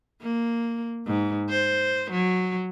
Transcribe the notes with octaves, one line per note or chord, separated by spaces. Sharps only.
A#3
G#2
C5
F#3